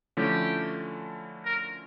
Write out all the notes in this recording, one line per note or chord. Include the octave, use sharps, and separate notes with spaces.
D3 F3 A3 C#4 E4 G4
A#4